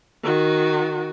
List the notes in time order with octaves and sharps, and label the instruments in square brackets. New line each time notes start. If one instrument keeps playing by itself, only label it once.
[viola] D#3 F#4